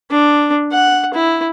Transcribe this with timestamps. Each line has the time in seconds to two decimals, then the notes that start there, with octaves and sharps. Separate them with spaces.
0.11 D4
0.72 F#5
1.14 E4